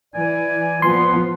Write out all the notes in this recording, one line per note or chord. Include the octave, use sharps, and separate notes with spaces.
E3 D5 G#5
F3 B3 C6